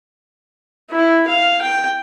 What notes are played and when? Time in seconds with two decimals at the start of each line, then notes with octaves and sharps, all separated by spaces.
0.91 E4
1.28 F5
1.62 G5